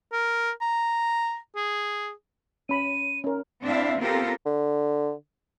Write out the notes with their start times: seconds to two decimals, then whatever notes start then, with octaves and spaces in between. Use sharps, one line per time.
0.12 A#4
0.61 A#5
1.56 G#4
2.69 C#4 B5 D#7
3.24 C#4 A#4
3.63 C4 D4 E4 E5 F5
3.99 B3 C4 F4 G4 A4 A#4
4.46 D3